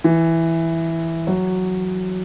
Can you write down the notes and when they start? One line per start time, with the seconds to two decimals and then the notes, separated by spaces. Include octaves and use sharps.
0.04 E3
1.27 F#3